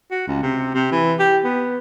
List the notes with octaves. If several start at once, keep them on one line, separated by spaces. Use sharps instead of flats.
F#4
C#2
C3
C3
E3
G4
B3